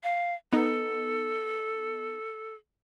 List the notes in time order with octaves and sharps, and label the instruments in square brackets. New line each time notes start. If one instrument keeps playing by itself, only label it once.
[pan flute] F5
[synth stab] B3 D#4 [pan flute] A4